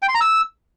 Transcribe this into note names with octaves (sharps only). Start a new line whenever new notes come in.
G5
C6
A#5
E6